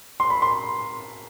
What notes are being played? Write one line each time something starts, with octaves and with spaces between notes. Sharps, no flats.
C6
B5
C6